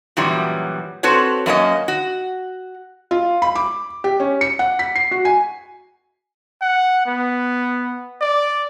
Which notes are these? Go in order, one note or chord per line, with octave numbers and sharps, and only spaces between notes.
F#2 A#2 E3 F#3 G3
C4 F#4 A4 B4 C#5
F#2 A#3 C#4 D#5
F#4
F4
B5
D6
G4
C#4
C#7
F#5
B6
C7
F#4
G#5
F#5
B3
D5